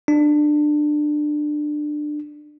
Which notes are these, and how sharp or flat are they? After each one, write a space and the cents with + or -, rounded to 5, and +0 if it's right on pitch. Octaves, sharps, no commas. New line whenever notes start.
D4 +20